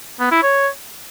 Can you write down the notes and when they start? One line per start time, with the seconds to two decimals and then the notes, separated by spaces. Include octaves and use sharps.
0.20 B3
0.32 E4
0.43 C#5